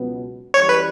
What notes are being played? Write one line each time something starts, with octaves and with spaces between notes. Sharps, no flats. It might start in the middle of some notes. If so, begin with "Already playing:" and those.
Already playing: C#2 B2 F#3 B3
F#2 E3 G3 C#5
B4